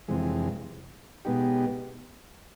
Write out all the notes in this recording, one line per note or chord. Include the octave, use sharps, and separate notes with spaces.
F2 C3 E3 G#3
B2 G#3 B3 D#4 G4